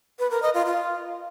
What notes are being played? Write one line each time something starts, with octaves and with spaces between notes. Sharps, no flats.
B4
A#4
D#5
F4
F4